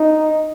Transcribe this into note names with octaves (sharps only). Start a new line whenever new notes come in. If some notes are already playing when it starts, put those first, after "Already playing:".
Already playing: D#4